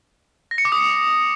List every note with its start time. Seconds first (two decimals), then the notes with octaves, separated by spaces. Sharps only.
0.51 A#6
0.58 C#7
0.65 D6
0.72 D#6